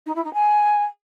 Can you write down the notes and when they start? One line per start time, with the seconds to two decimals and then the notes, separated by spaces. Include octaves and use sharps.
0.06 D#4
0.15 E4
0.24 D#4
0.33 G#5